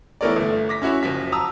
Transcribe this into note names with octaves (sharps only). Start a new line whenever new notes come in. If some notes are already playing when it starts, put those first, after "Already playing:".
E3 A3 B3 A#4 C#5 D5
G1 A3
D6 A#6 B6
C#4 E4 F#4 C#5
F#1 F3 F#4 B6
A5 A#5 D#6 E6